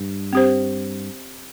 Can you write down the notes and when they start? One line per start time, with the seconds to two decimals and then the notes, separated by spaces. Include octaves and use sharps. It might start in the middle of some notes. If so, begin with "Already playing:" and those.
Already playing: G2
0.33 C4 G4 C5